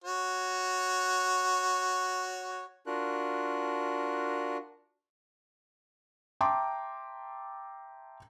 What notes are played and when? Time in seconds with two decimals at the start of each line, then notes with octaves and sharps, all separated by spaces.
0.04 F#4 C#5
2.87 D4 F4 F#4 A#4 F#6
6.41 E5 G5 A5 A#5 C6 D6